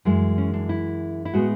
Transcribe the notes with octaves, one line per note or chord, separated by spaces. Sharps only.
F#2 E3 G#3
C#4
D4
E4
E4
A2 G#3 B3 F#4